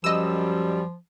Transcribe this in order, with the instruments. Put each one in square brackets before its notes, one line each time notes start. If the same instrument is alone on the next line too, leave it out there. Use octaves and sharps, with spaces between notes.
[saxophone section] F#2 G3 [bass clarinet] F3 [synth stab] D#5 E6